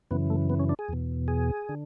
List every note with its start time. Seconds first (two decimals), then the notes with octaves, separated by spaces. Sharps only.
0.11 F#2 C#3 E3 B3
0.30 A3
0.50 B3
0.60 C#4
0.69 D4
0.79 G#4
0.89 E2 B2
1.28 G#4
1.69 D3